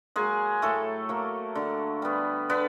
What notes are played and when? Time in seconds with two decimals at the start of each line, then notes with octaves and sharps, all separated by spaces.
0.16 F#3 G#3 A#3 G#4
0.62 A2 A3 A4
1.09 F#3 A#3
1.55 D3
2.02 G3 B3
2.49 D3 B3 B4